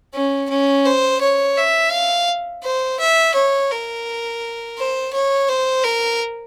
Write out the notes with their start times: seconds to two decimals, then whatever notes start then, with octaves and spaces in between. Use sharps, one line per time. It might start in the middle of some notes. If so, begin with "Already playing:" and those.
0.14 C#4
0.49 C#4
0.86 C5
1.21 C#5
1.57 E5
1.92 F5
2.63 C5
3.00 E5
3.34 C#5
3.71 A#4
4.78 C5
5.13 C#5
5.48 C5
5.83 A#4